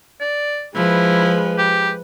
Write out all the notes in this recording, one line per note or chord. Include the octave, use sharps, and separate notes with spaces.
D5
F3 G#3 E4 B4
G4